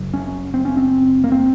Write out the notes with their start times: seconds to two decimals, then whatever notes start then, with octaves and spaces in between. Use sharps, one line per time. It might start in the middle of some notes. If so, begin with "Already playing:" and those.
Already playing: F#1 F#2 C#3
0.14 C#4
0.54 C4
0.65 C#4
0.77 C4
1.24 A#3
1.32 C4